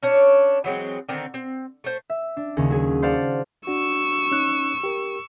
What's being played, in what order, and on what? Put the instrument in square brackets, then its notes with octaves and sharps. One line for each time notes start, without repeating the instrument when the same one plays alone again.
[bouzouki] C#4 D4 C#5
E3 F#3 G#3 C4
D3 D#3 C4 A#5
C4
A3 C5
[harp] E5
D4
D#2 C#3 C#4
F#3 G#4
C5 D5 F5 F#5 A5
[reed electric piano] D4 F#4 [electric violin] C#6 E6
[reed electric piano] C#4 D#4 F#6
G4 A#4